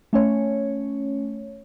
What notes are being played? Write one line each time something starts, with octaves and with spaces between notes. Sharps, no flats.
A3 C#4 C#5